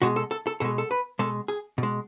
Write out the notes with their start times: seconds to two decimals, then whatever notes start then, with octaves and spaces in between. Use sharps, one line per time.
0.02 B2 G#3 F#4
0.16 A4
0.31 A4
0.47 A4
0.60 B2 G#3 A4
0.78 A4
0.91 B4
1.19 B2 G#3 A4
1.48 G#4
1.78 B2
1.83 G#3